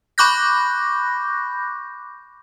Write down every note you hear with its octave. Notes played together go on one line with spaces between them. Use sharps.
B5 C#6 D6 F#6 G6 A#6